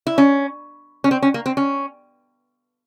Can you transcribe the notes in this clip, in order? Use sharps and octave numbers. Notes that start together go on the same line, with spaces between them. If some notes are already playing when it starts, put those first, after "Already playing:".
E4
C#4
C#4
C4
C#4
A#3
C4
C#4